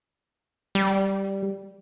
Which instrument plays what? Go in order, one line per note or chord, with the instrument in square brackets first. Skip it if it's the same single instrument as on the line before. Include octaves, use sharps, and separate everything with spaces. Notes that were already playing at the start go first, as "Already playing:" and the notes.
[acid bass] G3